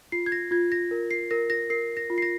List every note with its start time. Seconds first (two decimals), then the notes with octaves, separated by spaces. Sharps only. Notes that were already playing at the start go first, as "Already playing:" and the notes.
0.12 F4 C7
0.26 G#6
0.32 A#6
0.51 F4 G#6
0.72 A#6
0.91 A#4
1.11 C7
1.31 A#4 A#6
1.50 A#6
1.70 A#4 C7
1.97 A#6
2.10 F4
2.18 C7
2.22 A#6